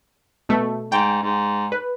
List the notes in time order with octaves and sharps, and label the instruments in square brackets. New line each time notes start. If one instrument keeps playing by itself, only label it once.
[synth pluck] B2 A3
[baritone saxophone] G#2 [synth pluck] G5
[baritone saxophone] G#2
[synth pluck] B4